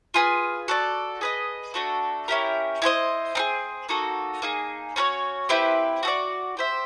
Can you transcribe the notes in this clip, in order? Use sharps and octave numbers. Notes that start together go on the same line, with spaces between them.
F4 G#4 B4
F#4 A4 D5
G#4 B4 D#5
A3 D4 F#4 A4
C#4 E4 G4 A#4
E4 G4 C5 D#5
C4 D#4 G#4
A#3 D#4 F#4 A4
A#3 D#4 G#4
C#4 F#4 A#4 C#5
C4 E4 G4 B4
F#4 A4 D5
G4 C5 E5